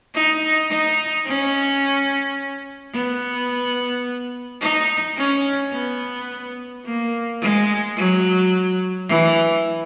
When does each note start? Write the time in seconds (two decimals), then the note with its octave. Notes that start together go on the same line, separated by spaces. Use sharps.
0.15 D#4
0.70 D#4
1.26 C#4
2.94 B3
4.61 D#4
5.17 C#4
5.73 B3
6.85 A#3
7.41 G#3
7.96 F#3
9.08 E3